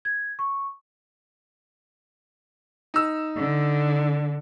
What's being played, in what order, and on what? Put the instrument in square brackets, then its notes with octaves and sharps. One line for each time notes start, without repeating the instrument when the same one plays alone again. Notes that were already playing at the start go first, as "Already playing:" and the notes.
[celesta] G#6
C#6
[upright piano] D#4 E6
[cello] D3